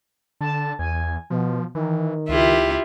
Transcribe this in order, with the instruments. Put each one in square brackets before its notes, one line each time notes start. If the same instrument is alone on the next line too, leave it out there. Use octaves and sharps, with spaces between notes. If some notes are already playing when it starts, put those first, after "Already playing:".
[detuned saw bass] D3 [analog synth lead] A5
[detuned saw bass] E2 [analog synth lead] G#5
[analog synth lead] B2 [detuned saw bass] F3
[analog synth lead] D#3 [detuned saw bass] E3
[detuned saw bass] C#2 [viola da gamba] E4 F4 G4